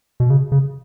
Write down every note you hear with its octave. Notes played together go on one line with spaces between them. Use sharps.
B2
C#3
C#3